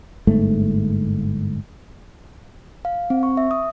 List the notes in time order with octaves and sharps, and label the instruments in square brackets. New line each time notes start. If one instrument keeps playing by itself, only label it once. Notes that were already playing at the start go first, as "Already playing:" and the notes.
[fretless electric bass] G1 G#2 A3
[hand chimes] F5
C4
C#6
E5
D#6